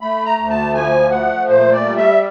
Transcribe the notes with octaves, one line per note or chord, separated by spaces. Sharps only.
A3 B5
A#5
D2
A5
F3 G#5
A3 F#5
A#2 C5
D5
G3
E5